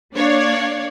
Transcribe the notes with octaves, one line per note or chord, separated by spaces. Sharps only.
A#3 D4 C#5 D5 F5